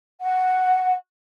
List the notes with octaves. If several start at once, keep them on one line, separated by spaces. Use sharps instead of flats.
F#5